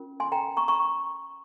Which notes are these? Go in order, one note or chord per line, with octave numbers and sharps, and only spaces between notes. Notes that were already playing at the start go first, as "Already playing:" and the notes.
Already playing: C#4 F4 A#4
G#5 C6
G5 A#5
A#5 C#6
A#5 C#6